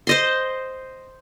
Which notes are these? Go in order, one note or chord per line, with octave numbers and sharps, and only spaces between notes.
C5 D#5 C6